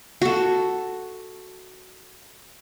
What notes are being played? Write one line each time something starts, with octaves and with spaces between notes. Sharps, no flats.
F#4 A4